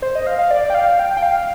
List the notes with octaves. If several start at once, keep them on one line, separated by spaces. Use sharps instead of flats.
C5
D#5
F5
F5
D5
G5
F5
G5
G5
F5